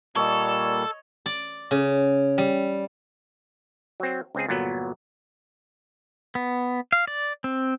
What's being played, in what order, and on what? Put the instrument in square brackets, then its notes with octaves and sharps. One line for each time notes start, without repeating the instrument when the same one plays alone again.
[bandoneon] A#2 G3 A#3 [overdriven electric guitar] A4 [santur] C#5 D#5 [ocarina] E6
[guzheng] D5
C#3
G3
[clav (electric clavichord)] F#3 C4
C#2 C4 G#4
G1 A#2 F#3 B3
[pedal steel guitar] B3
F5
D5
C4